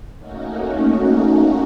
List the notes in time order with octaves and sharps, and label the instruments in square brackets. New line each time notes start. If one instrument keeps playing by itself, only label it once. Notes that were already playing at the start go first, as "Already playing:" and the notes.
[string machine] A3 A#3 C#4 D#4 F#4